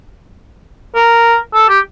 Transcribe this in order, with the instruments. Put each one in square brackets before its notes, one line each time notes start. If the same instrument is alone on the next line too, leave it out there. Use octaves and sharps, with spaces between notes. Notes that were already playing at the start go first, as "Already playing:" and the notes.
[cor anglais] A#4
A4
G4